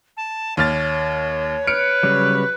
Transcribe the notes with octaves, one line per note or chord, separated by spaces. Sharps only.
A5
D#2 C#5 F6 A6
B4 F6 C#7 D7
C#3 F#3 G3